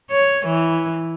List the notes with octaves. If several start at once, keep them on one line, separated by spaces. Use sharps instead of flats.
C#5
E3